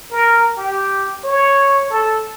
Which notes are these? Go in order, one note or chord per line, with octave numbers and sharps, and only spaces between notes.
A#4
G4
C#5
A4